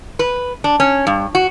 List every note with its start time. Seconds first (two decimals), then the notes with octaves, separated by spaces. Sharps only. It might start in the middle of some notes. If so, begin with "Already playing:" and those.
0.19 B4
0.64 D4
0.80 C#4
1.07 G2
1.35 F#4